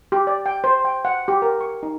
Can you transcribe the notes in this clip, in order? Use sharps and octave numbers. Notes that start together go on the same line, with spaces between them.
G4
D5
G5
C5
G5
F#5
G4
A#4
C#6
D#4